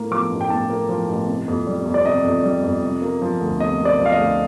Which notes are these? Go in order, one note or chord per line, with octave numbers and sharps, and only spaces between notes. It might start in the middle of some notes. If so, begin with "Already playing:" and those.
Already playing: A2 A#3
F3 D6
A1
G5
A2 A5
A#3
F3
A1
C3
F2
G3
F2
D5
C3 D#5
F2
G3
F2
C3
A#3
F3
D2
C3 D#5
A#3
D5
F3
F5
D#5
D2